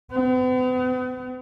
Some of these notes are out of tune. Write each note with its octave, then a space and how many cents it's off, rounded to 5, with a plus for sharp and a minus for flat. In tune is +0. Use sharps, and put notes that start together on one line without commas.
B3 +45